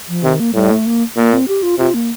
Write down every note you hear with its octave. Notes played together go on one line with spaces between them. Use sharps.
F3
C3 D#3
A#3
A2 G3
A3
A#3
A#2 A#3
C4
G4
F4
C3 F4
A#3